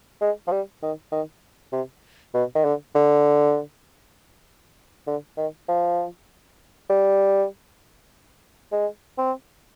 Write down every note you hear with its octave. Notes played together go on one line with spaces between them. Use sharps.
G#3
F3
G3
D#3
D#3
C3
B2
D#3
D3
D3
D3
D#3
F3
G3
G#3
C4